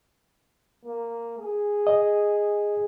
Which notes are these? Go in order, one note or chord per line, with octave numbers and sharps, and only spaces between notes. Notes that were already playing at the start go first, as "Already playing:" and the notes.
A#3
G#4
D#5